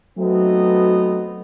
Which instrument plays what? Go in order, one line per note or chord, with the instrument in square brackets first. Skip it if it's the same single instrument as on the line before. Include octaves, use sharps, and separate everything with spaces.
[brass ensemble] F#3 A3 B3 C4 D#4